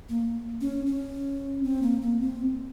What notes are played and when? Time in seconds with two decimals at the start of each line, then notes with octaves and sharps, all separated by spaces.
0.09 A#3
0.61 C#4
0.86 C#4
1.63 C4
1.82 A#3
2.02 A#3
2.21 C4